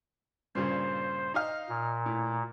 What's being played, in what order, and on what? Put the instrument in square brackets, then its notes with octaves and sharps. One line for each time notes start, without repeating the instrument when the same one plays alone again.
[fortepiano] G2 A#2 C#3 [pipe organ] C5
[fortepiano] D#4 D#5 F5
[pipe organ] A#2
[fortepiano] A2